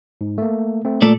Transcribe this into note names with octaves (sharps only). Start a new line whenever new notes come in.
G#2
A3 A#3
A3 C4
A#2 A3 A4 D5